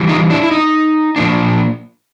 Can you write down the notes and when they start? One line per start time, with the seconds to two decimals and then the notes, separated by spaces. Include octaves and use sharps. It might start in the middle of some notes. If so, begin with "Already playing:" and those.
Already playing: E3 G3
0.09 D#4 F4
0.30 D4 E4
0.43 E4
0.51 D#4
1.16 A#2 F3 A#3 D4